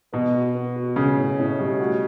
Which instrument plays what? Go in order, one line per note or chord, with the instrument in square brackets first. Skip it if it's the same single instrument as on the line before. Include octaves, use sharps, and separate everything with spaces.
[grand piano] B2 [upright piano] B3
[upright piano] F#4
B3
F#4
[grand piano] C#3 [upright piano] F#4
[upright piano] A2
A2
G3
F#4